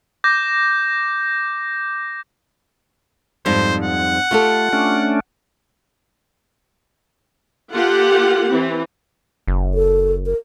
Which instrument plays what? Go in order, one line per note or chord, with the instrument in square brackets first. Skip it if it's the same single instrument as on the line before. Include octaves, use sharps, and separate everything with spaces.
[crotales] D6 G6 A#6
[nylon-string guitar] F2 G#2 G3 [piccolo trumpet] C5
[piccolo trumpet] F#5
[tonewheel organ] A3 [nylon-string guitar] F4 G4 A4
[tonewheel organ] A3 C#4 D4
[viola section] A#3 F4 G4 A4 F#5
E3 C4
[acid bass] F#1
[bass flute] A4
A#4